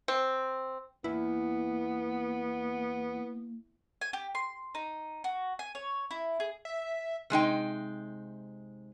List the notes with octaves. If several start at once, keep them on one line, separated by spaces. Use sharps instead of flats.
C4
E2 A#3 B3 E4
G#5
G4
C6
D#4
F#4
G#5
C#5
E4
G#4
E5
C3 G#3 D#4 G5